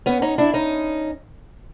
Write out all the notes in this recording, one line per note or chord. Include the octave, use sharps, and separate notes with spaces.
B3 C#4
C#4 D#4
D4 E4
C#4 D#4